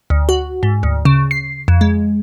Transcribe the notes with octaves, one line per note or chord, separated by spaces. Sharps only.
D2
F#4
G#2
D2
C#3
C7
F2
G#3